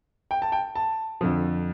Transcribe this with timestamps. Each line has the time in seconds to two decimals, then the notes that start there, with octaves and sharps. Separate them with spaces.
0.31 G5
0.42 A5
0.52 G5
0.75 A5
1.21 F2 D3 F3